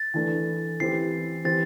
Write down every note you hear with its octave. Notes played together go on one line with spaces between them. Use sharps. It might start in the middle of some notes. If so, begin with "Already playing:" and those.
Already playing: A6
E3 A3 D4 A4
E3 C4 G4 C7
E3 C4 G4 A6